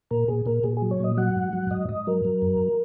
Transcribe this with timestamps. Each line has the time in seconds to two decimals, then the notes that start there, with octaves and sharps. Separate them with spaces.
0.11 A#2 A#4
0.28 A#2 G#4
0.46 A#2 A#4
0.64 A#2 G#4
0.77 G#4
0.82 F#3
0.91 C#5
1.00 A#2 D#5
1.17 F#3 F#5
1.36 G#2
1.53 F#3
1.71 G#2 D#5
1.88 G#2 D#5
2.07 F#3 A#4
2.25 F#3
2.42 F#2